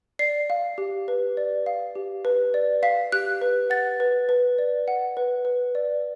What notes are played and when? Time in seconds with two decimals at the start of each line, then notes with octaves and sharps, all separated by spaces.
0.19 D5 C7
0.50 F5
0.78 G4
1.08 B4
1.37 D5
1.66 F5
1.95 G4
2.25 B4
2.54 D5
2.83 F5 B6
3.12 G4 F#6
3.42 B4
3.70 F#5 A6
4.00 B4
4.29 B4
4.58 D5
4.88 F#5
5.17 B4
5.45 B4
5.75 D5